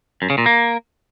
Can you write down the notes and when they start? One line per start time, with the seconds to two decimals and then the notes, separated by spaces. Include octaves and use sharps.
0.22 F#2
0.30 C#3
0.38 A#2
0.46 A#3